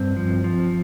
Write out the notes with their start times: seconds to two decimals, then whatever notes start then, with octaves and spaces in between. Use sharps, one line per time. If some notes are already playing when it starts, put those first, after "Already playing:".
Already playing: G2 C4
0.17 F3
0.44 F3